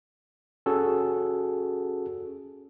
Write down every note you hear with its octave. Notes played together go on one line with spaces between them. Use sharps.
C#4 F#4 G#4 A4